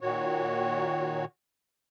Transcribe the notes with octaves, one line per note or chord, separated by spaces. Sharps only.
A#2 D#3 F#4 C#5